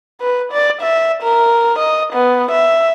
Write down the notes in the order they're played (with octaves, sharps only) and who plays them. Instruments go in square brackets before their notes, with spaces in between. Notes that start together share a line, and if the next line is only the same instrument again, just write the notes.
[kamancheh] B4
D5
E5
A#4
D#5
B3
E5